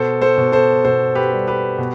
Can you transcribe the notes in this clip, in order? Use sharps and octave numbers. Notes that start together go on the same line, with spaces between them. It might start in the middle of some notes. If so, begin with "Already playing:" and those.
Already playing: B2 A4 C5
A4 C5
B2
A4 C5
B2 A4 C5
G4 B4
G3
G4 B4
B2